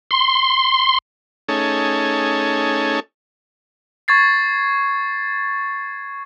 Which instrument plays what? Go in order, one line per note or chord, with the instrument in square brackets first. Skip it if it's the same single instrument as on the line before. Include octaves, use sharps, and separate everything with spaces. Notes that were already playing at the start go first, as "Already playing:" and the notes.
[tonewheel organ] C6
[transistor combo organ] A3 C#4 D#4 G#4 A4 C#5
[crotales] C#6 G#6 A6 C7